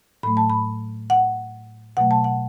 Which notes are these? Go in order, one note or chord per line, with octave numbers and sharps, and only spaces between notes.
A2 F#3 A3 B5
A5
B5
F#5
B2 F#3 A3 F#5
A5
F#5